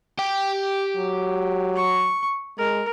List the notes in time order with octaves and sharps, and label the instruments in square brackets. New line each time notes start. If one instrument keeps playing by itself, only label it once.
[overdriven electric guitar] G4 G5
[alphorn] F#3
[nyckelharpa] C#6
[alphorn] G#3 [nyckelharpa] A#4